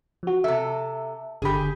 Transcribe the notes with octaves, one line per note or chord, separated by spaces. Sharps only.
F3 F#4
C3 A4 E5
G1 D3 G4 G#4 B5